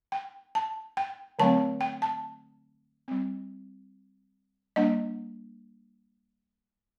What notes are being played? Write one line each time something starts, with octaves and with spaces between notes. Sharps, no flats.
G5
A5
G5
D3 F#3 A3 C4 A5
G5
A5
G3 C4
G3 A#3 D4 D#5